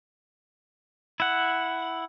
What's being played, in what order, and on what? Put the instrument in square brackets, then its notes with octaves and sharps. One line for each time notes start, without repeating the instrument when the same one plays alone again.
[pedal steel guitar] E4 F#5